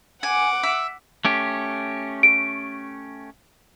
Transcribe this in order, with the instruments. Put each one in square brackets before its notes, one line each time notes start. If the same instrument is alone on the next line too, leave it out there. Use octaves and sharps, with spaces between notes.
[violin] F#5 D6 [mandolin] G#5
[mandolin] E5
[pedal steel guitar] A3 C#4 G4
[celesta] D7